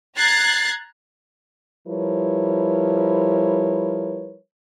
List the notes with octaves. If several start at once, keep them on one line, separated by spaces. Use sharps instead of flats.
A#5 F#6 G#6 A6 C7
F3 G3 E4 A#4 B4 C#5